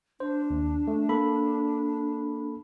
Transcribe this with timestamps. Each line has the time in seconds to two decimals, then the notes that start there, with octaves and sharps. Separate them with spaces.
0.20 D4 C5
0.50 D#2
0.88 A3
1.09 A#3 A4 B5